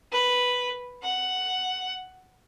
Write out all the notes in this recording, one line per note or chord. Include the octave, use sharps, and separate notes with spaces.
B4
F#5